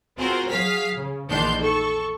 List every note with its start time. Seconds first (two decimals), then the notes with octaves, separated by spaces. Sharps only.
0.18 C4 F4 F#4 G#4 A#4 C5
0.50 F#3 G#4 F5 F6 B6
0.95 C#3
1.28 A#1 E2 D#3 D4 C6 G6
1.60 A4 C#6